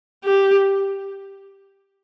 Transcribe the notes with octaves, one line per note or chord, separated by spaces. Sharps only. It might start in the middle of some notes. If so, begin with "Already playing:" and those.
G4